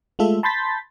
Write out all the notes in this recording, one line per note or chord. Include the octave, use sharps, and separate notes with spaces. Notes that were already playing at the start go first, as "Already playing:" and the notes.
G#3 A3 F4 A4 E5
A5 B5 C6 G6 A6 B6